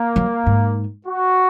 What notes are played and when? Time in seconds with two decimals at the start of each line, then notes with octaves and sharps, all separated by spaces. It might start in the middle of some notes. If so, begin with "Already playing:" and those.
Already playing: A#3
0.16 F#3
0.46 G#2
1.07 F#4